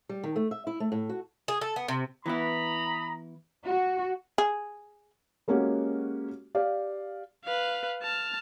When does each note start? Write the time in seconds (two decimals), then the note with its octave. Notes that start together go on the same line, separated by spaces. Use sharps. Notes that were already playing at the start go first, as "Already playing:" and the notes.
0.09 G3
0.23 D#3
0.36 A3
0.51 E5
0.67 E4
0.80 A3
0.92 A2
1.09 F#4
1.48 G#4
1.61 A4
1.76 B3
1.88 C3
2.26 E3 B3 E4 A#5 B5 D#6
3.66 F#4
4.38 G#4
5.48 G#3 A#3 C#4 F#4 G4
6.55 G4 D5 F5
7.45 B4 F5
8.02 A5 F6